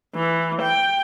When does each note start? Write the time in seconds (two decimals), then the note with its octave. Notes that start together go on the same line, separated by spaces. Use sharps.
0.15 E3
0.62 G5